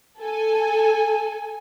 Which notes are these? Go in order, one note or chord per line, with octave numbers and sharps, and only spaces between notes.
A4 G#5